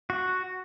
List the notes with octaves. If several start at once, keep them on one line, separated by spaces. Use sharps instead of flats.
F#4